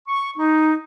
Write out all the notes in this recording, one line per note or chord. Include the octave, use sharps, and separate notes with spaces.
C#6
D#4